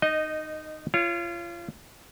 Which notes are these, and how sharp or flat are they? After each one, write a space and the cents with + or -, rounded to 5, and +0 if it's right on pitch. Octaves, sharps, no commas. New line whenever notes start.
D#4 -15 D#5 +0
F4 -30 C#5 +0